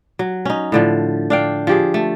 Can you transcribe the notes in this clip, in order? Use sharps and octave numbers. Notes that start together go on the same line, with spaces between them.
F#3
C#4 D#4
A2 D3 F3
D4 F5 G5
F3 G4 G#4
A3